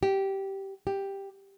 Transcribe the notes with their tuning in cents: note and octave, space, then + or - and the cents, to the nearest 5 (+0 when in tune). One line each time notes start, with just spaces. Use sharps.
G4 -10
G4 +5